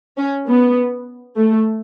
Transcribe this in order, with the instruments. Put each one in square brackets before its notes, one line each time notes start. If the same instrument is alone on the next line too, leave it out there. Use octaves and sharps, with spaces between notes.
[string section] C#4
B3
A3